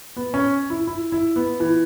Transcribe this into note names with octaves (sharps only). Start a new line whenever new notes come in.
B3
C#4
E4
E4
E4
B3
E3